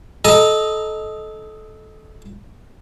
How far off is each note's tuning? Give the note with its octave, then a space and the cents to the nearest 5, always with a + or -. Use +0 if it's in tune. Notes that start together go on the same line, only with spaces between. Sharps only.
A4 -20 D#5 +0 A#5 +0